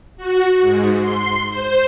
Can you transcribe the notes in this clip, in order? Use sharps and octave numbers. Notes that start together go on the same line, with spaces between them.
F#4
G#2
C6
C5